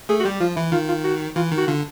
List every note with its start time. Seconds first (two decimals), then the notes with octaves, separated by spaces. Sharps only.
0.09 A3 G#4
0.20 F#4
0.24 G3 G4
0.40 F3 F4
0.56 E3 E4
0.72 D#3 F4
0.88 F4
1.04 F#4
1.36 E3 F4
1.51 D#3
1.57 F#4
1.67 D3 F4